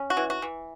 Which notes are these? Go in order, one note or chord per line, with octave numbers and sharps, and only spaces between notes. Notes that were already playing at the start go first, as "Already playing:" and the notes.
Already playing: C#4
F#4
E3
F#4
E3